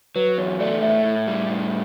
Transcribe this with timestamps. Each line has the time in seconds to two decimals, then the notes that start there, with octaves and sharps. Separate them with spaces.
0.16 F#3 B4
0.38 E2 C#5
0.60 A3 D5
0.82 A2 E5
1.05 A2
1.27 G3
1.49 A2